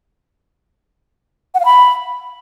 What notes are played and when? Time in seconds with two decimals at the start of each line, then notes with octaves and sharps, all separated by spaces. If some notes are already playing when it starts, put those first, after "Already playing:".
1.54 F#5
1.60 F5
1.65 B5